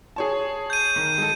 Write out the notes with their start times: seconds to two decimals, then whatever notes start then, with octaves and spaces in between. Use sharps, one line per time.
0.16 G#4 C#5 A5
0.70 G6 D#7
0.96 D#3
1.18 G#3 A4